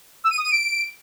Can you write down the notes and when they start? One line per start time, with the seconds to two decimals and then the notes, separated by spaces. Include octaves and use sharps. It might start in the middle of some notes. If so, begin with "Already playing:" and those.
0.24 E6
0.31 D#7
0.38 D#6
0.44 D#7
0.51 D7